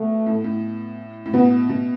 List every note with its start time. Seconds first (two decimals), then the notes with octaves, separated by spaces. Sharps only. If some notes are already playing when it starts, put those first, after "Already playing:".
Already playing: B2 A3
0.26 A2
0.44 A2
1.26 A2
1.33 B2 B3
1.69 B2